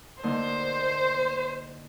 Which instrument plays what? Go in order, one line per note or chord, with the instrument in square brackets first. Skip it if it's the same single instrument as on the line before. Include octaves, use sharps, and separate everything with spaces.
[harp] D3 A#3 D#4 [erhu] C5